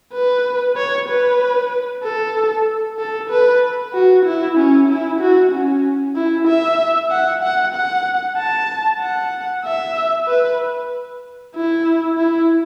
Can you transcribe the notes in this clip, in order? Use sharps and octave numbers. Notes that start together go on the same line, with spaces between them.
B4
C#5
B4
A4
A4
B4
F#4
E4
C#4
E4
F#4
C#4
E4
E5
F#5
F#5
F#5
A5
F#5
E5
B4
E4
E4